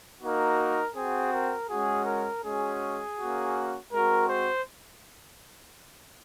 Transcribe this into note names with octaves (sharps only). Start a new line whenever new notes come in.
A#3 D#4 F#4 A#4
C4 F#4 G#4
A#4
G#3 C#4 F#4 G#4
A#4
G#3 C#4 F#4 G#4
A#3 C#4 F#4
G#3 C4 F#4 A#4
C5